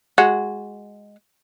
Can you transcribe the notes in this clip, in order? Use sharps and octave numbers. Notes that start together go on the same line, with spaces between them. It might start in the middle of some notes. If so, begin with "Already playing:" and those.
G#3 F#4